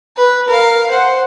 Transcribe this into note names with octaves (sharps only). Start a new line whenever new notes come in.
B4
A#4 F5
C5 F#5